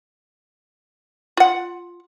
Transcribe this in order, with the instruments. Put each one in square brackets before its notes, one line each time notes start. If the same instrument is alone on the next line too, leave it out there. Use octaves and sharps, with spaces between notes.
[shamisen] F4 F#5